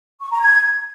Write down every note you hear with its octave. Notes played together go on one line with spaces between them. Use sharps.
C#6
A#5
G#6